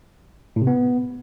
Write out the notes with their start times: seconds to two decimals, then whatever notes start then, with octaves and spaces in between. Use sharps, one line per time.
0.56 A2
0.62 C3
0.67 B3